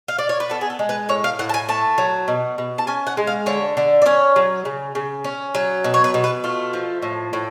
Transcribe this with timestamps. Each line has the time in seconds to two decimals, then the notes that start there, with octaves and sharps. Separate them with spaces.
0.08 F5
0.19 D5
0.29 C#5
0.40 B4
0.50 B3 A4
0.61 G#4
0.70 A4
0.79 G#3
0.89 B4
1.09 A2 C#5
1.24 F5
1.39 A2 F#5
1.49 A5
1.54 G#5
1.69 A3 A5
1.98 F#3
2.28 B2
2.58 B2
2.78 A5
2.87 C#4 G#5
3.07 F#5
3.17 G#3
3.27 F5
3.46 D3 C#5
3.77 D3
4.02 D5
4.06 C#4 C#5
4.36 F#3
4.65 C#3
4.95 C#3
5.24 C#4
5.55 F#3
5.84 B2
5.94 C#5
6.04 B4
6.14 B2
6.24 B4
6.44 A3 F4
6.74 F3
7.02 A2
7.33 A2